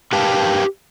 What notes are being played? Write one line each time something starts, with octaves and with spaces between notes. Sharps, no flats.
G4 A#4 B4 F5 G5 A5